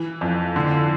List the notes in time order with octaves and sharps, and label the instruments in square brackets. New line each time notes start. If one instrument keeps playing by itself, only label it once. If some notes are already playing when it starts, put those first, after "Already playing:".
Already playing: [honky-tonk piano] E3
F2
D3